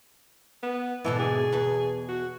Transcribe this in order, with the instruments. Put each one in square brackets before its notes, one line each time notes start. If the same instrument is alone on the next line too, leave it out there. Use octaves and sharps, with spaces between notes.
[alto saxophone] B3
[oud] G#2 B2 D3 [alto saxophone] E3
[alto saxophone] G#4
[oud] E2 B2 B4
[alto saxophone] F#4